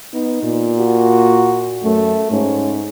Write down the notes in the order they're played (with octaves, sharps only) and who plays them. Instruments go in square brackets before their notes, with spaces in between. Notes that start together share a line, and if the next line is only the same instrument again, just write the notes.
[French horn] B3 [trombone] D#4
[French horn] A#2
[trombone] F#4
[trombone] F#2 [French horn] A3
[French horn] G#2 [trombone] C#4